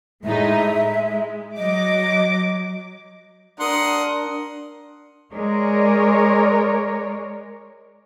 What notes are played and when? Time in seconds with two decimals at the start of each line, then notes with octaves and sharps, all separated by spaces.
0.24 A2 G#3 D#4 E5
0.69 G#3
1.57 F#3 D#5 D6
3.60 D4 A#4 F#5 C6 D#6
5.35 G#3 A#4 C#5 D5